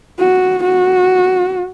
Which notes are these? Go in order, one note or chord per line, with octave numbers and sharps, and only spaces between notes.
F#4
F#4